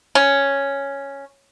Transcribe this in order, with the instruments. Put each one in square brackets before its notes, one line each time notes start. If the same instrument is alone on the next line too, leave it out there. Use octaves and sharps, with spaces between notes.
[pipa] C#4